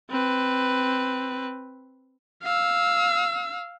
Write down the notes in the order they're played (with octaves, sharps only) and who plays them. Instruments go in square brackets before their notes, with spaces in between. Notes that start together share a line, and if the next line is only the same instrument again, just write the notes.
[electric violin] C4 B4
F5 E6